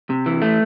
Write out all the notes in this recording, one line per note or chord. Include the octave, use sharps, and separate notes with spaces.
C3
E3
A3